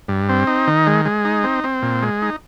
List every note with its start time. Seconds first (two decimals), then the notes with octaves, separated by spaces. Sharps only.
0.08 G2
0.29 C4
0.47 D#4
0.67 D#3
0.87 G#3
1.05 G#3
1.25 D#4
1.44 C4
1.64 C4
1.82 A#2
2.03 G#3
2.22 D#4